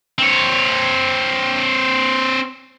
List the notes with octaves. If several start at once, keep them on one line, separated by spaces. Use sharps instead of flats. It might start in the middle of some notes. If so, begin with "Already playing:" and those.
C4 C#5